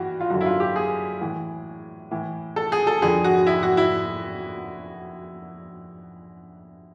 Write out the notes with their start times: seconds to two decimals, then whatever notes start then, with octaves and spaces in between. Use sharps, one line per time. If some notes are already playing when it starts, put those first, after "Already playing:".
Already playing: G2 E3 F#4
0.21 F4
0.30 F#2 D3 F#4
0.41 E4
0.46 F4
0.60 G4
0.76 G#4
1.21 A2 E3
2.11 A2 E3
2.56 A4
2.72 G#4
2.87 A4
3.02 F2 D3 G#4
3.24 F#4
3.47 E4
3.63 F#4
3.77 E4